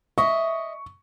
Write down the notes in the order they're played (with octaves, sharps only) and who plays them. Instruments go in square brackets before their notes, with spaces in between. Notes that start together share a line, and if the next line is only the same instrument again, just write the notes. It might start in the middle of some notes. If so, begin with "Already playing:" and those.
[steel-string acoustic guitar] D#5 E5 [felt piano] C#6